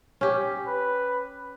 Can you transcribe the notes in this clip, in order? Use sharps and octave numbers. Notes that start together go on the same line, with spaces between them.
C#4 G4
B4